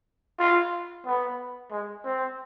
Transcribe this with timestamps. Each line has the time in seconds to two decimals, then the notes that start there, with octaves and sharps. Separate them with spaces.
0.39 F4
1.05 B3
1.71 G#3
2.04 C4